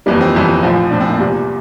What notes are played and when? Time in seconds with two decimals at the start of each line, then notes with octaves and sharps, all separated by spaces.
0.06 G1 F2 E3 G3 A#3
0.21 C4
0.35 G1 F2 E3 G3
0.63 A#1 A2 F3
0.90 A#1 A2 F3 D4
1.00 C4
1.10 A#3
1.19 E2 C3 G3